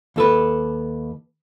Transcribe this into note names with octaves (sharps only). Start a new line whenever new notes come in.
D#2 A4 B4